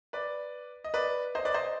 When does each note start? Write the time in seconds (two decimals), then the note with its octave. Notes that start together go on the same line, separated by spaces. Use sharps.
0.13 B4 D5
0.84 D#5
0.94 B4 D5
1.35 C5 D#5
1.45 B4 D5
1.54 C5 D#5